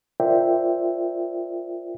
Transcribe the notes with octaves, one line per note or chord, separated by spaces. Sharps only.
F4 A#4 C5 D5 E5 G5